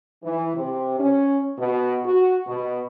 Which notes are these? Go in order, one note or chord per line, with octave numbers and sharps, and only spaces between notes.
E3
C3
C#4
B2
F#4
B2